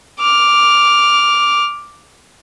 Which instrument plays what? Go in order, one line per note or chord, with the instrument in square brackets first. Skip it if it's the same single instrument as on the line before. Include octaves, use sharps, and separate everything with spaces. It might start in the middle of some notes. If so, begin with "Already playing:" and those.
[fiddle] D6 F6